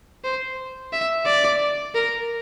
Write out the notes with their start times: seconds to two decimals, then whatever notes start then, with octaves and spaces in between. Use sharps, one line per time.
0.24 C5
0.93 E5
1.26 D5
1.95 A#4